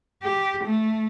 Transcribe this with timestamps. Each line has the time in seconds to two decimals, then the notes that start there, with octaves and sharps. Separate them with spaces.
0.23 G4
0.64 A3